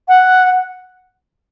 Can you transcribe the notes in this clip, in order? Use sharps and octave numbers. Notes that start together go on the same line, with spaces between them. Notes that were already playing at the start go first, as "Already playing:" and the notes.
F#5